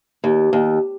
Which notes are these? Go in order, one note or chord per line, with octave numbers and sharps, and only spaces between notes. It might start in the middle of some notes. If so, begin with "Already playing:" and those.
D#2
D#2